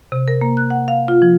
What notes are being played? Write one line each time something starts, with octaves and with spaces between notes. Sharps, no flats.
C3
A#4
A#3
F#6
F#5
F5
F4
F3